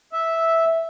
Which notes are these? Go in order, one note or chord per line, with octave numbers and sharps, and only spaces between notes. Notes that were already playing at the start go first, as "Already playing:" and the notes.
E5